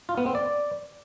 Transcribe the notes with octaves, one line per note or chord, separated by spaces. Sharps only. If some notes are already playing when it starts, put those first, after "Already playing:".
F4
B3
C4
D5